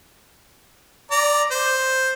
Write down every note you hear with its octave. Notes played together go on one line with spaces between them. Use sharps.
D5 A#5
C5